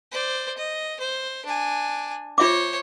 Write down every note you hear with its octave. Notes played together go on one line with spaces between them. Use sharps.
C5 D5
D#5
C5
D4 G#5
F4 C5 C#5 E5 D6